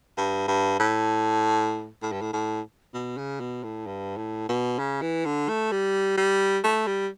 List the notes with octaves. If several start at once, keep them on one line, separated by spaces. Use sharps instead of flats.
G2
G2
A2
A2
G2
A2
A2
B2
C#3
B2
A2
G2
A2
B2
C#3
E3
D3
A3
G3
G3
A3
G3